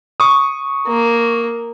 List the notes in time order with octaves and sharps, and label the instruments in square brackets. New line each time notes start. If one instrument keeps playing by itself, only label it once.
[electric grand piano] C#6 D#6
[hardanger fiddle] A#3